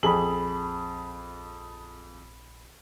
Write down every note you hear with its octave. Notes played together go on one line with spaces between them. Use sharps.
A#1 F2 G#4 B5 F#7